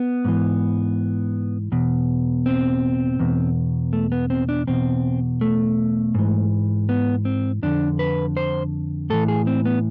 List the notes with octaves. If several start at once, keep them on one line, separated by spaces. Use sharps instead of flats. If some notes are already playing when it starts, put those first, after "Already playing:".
Already playing: B3
G#2 E3
E2 B2
C4
E2 B2
A3
B3
C4
D4
E2 B2 C4
A3
G#2 E3
B3
C4
F2 D3 D4
B4
C5
A2 E3 A4
G#4
C4
B3